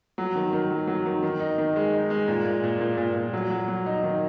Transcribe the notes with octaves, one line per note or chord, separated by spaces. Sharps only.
F#3
D#3
D#3
F#3
F#3
D#3
D#3
D#4
D#3
G#3
D#4
G#3
A#2
A#2
A#2
A#2
A#2
A#2
F#3
F#3
F#3
D#4
D#3